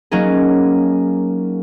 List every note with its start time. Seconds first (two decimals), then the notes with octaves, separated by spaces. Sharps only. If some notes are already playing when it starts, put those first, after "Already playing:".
0.11 F#3 A#3 C#4 D#4 G#4